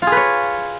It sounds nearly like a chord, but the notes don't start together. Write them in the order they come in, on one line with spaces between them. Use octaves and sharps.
F4 G#4 B4 C#5